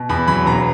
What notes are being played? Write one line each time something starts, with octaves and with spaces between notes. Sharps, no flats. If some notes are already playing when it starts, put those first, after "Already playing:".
Already playing: B2
E2 B5
F#3 B5
E1 A#5